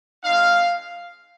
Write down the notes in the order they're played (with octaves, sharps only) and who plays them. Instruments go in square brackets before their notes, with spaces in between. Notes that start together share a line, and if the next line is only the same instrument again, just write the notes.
[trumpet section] G#3 C4 D#4 F5